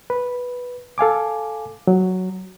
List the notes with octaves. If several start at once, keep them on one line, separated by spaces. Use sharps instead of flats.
B4
A4 F5 G#5 D6
F#3